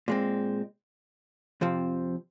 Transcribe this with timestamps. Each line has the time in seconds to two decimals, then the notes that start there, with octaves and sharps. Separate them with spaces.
0.08 A#2 G#3 C4
1.61 F2 C3 F3 C4